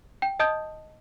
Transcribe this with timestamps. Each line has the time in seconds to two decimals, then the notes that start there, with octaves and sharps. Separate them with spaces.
0.22 G5
0.40 D#5 A5 D#6 G6